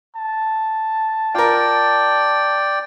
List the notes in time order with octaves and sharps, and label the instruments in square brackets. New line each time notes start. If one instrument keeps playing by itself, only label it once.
[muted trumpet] A5
[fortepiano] F4 A#4 [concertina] D5 G5